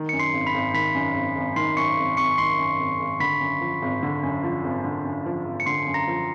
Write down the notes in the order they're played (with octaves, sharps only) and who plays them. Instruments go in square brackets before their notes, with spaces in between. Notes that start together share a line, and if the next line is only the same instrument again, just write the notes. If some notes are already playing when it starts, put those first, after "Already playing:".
Already playing: [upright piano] D#3
[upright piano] F#2 [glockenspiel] C#7
[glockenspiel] C6 C7
[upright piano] G#1
[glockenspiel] B5 B6
[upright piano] G#1
[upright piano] D#3 [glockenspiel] B5 B6
[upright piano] F#2
G#1
G#1
[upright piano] D#3 [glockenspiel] C6 C7
[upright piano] F#2 [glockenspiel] C#6 C#7
[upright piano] G#1
[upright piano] G#1 [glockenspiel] C#6 C#7
[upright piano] D#3 [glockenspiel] C6 C7
[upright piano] F#2
G#1
G#1
[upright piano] D3 [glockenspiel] B5 B6
[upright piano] F#2
F3
G#1
D3
F#2
F3
G#1
D3
F#2
F3
G#1
[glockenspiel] C#7
[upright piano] D3 [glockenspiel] C6 C7
[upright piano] F#2
[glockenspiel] A#5 A#6
[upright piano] F3